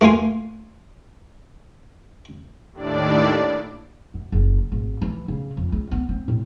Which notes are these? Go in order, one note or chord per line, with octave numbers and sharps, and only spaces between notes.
A3 A#3 F4 G#5 C6
D#2 A2 D4 D5
F#2
F#1
G#1
E3
C#3
F2
C#2
B3
C4
A2